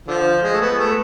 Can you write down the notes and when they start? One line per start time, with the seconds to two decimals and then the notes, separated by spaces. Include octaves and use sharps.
0.08 D3 F3
0.43 G#3
0.53 A3
0.61 B3
0.79 A3